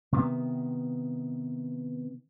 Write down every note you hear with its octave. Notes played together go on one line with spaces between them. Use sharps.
C3 D#3 B3